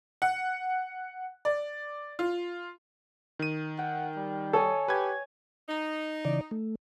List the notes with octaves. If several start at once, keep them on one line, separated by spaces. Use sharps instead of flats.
F#5
D5
F4
D#3 D#7
F#5 G5
G3
A4 C#5 D#5 G#5
G4 B4 G#6
D#4
C#3 E3 D5
A3